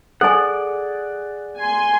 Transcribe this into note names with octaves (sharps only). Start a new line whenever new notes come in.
G#4 A4 D5 F#5 G#5
G#5 C6